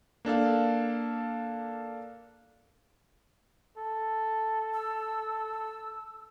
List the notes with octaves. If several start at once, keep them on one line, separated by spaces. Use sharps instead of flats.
A#3 D4 A4 F5
A4
E6